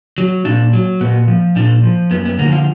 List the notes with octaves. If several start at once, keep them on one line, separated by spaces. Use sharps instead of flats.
F#3
A#2 D4
F#3
A#2 B3
F3
A#2 D4
F3
F#2 B3
B3
D3 F3 A#3
F4